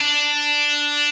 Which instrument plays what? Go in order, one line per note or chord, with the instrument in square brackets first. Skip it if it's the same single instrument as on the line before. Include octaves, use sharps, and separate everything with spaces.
[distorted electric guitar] D4